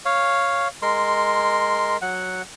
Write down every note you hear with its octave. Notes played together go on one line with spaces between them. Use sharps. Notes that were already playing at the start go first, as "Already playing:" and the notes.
C#5 F5
G#3 A#4 C6
F#3 F#5